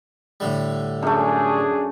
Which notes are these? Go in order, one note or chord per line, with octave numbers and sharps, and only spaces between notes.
A2 D3 G3
F#2 A3 D4 G#4